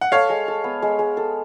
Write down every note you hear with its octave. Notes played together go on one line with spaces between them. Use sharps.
F#5
A4 C#5 F5
G#3
A4
B3
G#3
G#3
A4